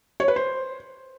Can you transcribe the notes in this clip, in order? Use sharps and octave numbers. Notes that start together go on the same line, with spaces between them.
C#5
B4
C5